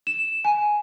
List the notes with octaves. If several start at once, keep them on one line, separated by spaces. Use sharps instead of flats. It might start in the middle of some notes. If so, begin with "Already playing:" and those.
E7
G#5